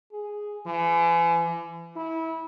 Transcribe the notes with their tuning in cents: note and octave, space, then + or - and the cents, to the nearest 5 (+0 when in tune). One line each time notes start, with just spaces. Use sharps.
G#4 +0
E3 +35
E4 -25